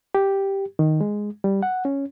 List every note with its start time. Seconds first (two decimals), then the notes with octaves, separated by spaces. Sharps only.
0.15 G4
0.79 D#3
1.01 G#3
1.44 G3
1.63 F#5
1.85 C#4